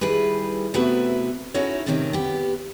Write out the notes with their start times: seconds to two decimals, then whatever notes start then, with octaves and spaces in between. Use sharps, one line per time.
0.01 D#3 G3 E4 G#4 B4
0.74 C3 A3 B3 E4 F#4 B4
1.54 C#4 D#4 E4 F#4 A4 C#5
1.86 A2 C3 D#3 C4 C#4
2.13 B3 G4